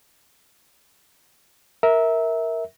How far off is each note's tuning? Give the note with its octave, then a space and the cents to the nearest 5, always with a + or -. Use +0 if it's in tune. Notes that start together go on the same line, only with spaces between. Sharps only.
A#4 +0 E5 -20